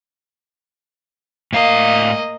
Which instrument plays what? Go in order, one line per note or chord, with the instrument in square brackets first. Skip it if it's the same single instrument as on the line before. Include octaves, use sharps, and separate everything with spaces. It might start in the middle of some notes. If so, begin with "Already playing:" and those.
[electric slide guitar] A2 F5 [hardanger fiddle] A#3 D#5